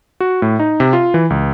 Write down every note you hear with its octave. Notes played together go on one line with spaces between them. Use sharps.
F#4
A2
D#4
C3
F4
E3
C#2